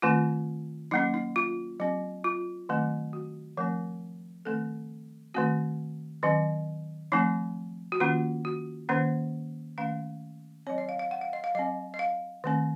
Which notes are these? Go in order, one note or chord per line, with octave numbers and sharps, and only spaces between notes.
D#3 A3 C4 F4
F#3 A#3 C#4 D#4
D#4
F4
F#3 C4
F4
D#3 F#3 A3 C4
F#4
F3 A3 C4 A#4
D#3 A3 C4 A4
D#3 A3 C4 F#4
D#3 F#3 C4
F3 A3 C4 D#4
F#4
D#3 A#3 C#4 F4
F#4
D#3 A#3 C#4 C5
D#3 A3 C#4 F5
F#3 C4 C#5
D#5
F5
F5
F#5
F5
D#5
F5
F#3 C4 D#5
D#5
F5
D#3 A3 C4